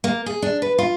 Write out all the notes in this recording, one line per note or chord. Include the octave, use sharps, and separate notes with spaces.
A#3
G#4
D4
B4
F4